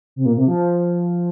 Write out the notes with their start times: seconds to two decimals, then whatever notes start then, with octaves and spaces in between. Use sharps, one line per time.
0.16 C3
0.26 A#2
0.37 C3
0.48 F3